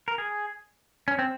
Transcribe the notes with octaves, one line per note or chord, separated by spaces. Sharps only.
A#4
G#4
C#4
C4